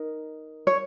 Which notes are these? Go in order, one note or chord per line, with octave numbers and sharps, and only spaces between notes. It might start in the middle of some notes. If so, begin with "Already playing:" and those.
Already playing: D#4 A#4
C#5